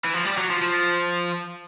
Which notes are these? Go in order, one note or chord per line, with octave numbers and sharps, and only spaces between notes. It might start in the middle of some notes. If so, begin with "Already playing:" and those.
E3
F3
G3
F#3
F3
F3